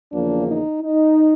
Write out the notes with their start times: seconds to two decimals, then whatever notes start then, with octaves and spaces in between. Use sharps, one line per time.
0.12 E2 C#3 F3 A#3 D4
0.48 D#4
0.81 D#4